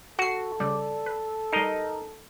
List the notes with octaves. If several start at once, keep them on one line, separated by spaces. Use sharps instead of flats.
F#4 A4 F#5 C7
C#3 G3 D5
B4
G3 D#4 A#4 D#5 C7